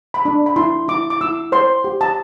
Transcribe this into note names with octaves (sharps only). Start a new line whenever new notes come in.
B5
D4
B5
E4 C6
E4 D6
D6
E4 E6
C5 C6
G4
A5